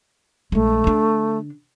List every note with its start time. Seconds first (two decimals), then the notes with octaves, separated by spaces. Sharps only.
0.52 A#1 G#3 A3
0.84 D3 D4